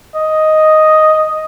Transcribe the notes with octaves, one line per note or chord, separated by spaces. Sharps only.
D#5